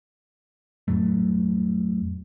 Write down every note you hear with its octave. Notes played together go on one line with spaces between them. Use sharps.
F2 A2 F#3 A3